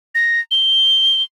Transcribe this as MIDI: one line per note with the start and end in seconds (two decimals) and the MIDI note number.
0.15 0.40 94
0.51 1.23 103